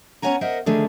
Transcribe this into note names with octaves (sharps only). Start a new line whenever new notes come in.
B3 C#4 C#5 F#5 G#5 A#5
A#4 C5 D#5 E5 F#5
D3 D#3 F3 A3 G#4